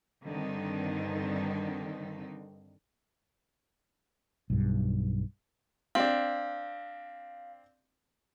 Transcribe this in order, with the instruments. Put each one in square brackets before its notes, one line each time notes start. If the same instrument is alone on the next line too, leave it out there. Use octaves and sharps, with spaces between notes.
[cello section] G2 D3 D#3 C4 D#4
[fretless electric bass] B1 G2
[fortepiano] C4 D4 [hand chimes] F5